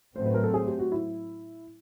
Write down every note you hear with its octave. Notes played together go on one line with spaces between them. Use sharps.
A2 F#3 A3 C4 C5
B4
A#4
A4
G#4
G4
F#4
E4